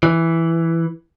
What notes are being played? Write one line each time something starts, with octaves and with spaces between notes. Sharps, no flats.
E3